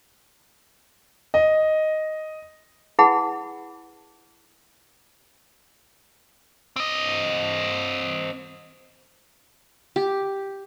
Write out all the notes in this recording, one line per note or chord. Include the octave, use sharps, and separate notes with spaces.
D#5
E4 G#4 B4 F#5 G#5 B5
C4 D#5
G4